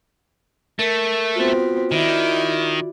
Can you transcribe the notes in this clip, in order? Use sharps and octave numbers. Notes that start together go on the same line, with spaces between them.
A3 A#4
B3 C4 F4 F#4
D#3 E4 D5